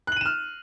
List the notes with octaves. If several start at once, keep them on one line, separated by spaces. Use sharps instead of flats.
F6 F#6 D#7 E7 F#7